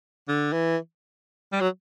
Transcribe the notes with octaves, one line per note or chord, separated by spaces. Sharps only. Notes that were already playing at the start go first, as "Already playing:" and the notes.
D3
E3
G3
F#3